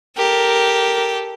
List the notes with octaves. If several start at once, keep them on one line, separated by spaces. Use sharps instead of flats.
G4 A4 A#4